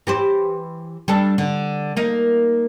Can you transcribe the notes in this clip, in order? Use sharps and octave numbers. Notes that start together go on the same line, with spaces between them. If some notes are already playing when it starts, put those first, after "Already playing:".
E3 G4 C5
G3 D4 A4
D3
A#3 D#4